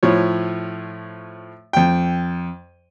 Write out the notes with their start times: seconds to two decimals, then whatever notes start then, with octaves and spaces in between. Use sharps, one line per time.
0.03 A2 F3 C#5
1.73 F2 G5